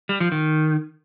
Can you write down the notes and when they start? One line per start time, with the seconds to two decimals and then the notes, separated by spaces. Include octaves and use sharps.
0.09 G3
0.20 F3
0.32 D#3